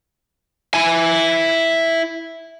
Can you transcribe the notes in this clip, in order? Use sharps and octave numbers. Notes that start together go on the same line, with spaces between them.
E4 G#5